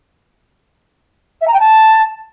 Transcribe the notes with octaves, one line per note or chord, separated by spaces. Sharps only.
E5
A#5
G5
A5